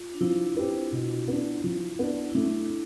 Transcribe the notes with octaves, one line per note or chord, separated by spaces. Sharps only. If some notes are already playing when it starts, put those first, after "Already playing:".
Already playing: F4
D4
F3 E4
C4 G4 B4
B2
B3 D4
F3
B3 D4
E4
A3 D4